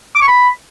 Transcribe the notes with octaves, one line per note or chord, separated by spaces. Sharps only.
D6
C#6
B5